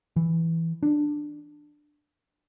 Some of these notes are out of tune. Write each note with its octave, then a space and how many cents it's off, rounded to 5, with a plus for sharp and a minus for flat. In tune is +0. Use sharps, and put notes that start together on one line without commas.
E3 +0
D4 +10